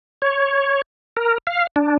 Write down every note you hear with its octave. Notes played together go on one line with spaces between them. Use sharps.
C#5
A#4
F5
D4